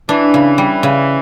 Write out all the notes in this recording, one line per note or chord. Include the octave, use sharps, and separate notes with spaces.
E3 D4
C#3
G3
C#3